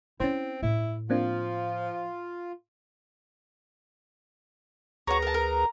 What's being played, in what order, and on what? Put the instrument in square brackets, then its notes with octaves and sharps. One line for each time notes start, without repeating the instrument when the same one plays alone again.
[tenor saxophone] C4 [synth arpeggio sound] C#4 C5 [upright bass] E4
[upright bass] A2 [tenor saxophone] E4
[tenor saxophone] F3 [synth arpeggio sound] A#3 C4 D4 [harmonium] F4
[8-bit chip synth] D2 G#4 B4 [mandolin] F#4 C#5 [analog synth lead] A#5
[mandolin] A#4 A5
A#4